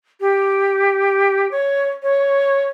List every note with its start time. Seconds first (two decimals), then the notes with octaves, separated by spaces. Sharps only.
0.20 G4
1.51 C#5
2.03 C#5